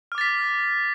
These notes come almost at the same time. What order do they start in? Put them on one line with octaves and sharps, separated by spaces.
F6 D6 A6 B6